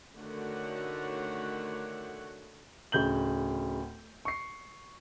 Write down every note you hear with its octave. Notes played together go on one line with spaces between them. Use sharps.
D3 D#3 A3 F#4 C#5 F#5
D1 C#3 G6 F#7
C#6 C7